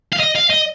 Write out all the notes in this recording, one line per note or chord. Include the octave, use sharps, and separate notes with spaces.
F5
D#5
F5
D#5